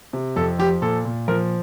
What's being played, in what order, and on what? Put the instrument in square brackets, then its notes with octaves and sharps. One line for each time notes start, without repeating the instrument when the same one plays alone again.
[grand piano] C3
F2 A4
F3 G4
A#2 A4
A#2
F3 A#4